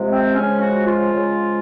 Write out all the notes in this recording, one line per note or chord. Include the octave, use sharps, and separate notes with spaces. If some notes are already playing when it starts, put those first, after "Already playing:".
Already playing: C3 F3 G#3
C4
C#3 F3 G#3 C#4
F#4
F4
C#3 F3 G#3